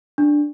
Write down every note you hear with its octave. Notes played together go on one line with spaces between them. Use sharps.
D4